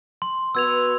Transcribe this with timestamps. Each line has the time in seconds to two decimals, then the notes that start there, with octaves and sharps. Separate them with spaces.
0.22 C6
0.55 B3 F#4 B4 E6 G#6 F7